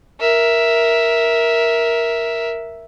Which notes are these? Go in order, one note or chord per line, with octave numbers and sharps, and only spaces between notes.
A#4 E5